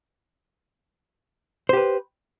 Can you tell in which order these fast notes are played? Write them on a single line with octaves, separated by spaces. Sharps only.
C5 G4 B4